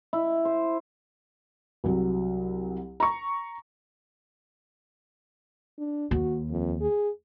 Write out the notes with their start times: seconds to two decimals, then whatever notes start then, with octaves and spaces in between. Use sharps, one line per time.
0.13 E4
0.45 C5
1.84 C2 F#3
3.00 A#5 C#6
5.78 D4
6.11 D#2 F#4
6.50 F2
6.81 G#4